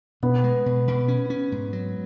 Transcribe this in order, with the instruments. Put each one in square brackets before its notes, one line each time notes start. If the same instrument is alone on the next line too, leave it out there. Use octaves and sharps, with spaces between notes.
[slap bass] B2 [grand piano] B3
[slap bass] G#3
B2
B2
C#4
C#4
G#2
F#3